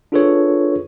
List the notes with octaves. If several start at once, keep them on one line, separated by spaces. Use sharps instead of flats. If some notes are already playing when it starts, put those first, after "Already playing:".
D4 F4 G#4 A4 B4 C#5